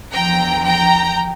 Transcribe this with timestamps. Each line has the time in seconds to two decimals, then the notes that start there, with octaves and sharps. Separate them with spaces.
0.12 E2 D3 F3 G5 A#5
0.65 G5 A#5